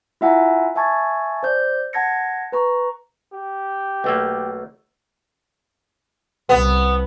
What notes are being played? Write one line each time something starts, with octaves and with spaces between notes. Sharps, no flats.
E4 F4 E5 F#5 G#5 A#5
E5 G#5 A5 C#6 G#6 A6
C5 D5 G6
F#5 A5 G#6 A#6 C#7
B4 A#5 C#6
G4
B1 A3 A#3
C2 B3